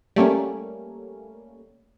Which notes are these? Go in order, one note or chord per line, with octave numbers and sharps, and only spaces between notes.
G3 A3 A#3 C#4